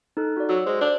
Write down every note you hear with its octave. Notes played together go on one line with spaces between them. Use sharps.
D#4 A4 F#6
F#4 D5
F#3 F#4 E6
G#3 C5
D4